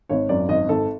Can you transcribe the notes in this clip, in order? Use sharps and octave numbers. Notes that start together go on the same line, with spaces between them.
G#1 C#5
F#2 D5
G#1 D#5
G#1 A4